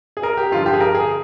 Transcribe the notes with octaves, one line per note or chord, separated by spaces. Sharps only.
G#4
A#4
G4
G2 D3 F3 F4
G4
G#4
A#4
G#4